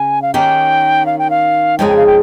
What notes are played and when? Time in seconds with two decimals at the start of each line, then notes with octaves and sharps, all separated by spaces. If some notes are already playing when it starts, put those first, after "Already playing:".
Already playing: C#3 G#5
0.22 F5
0.34 D#3 A#3 C#4 G4 G5
1.06 F5
1.19 G5
1.30 F5
1.78 F2 C#3 G#3 D#4 G#4 G5
1.88 G5
1.97 F5
2.06 G5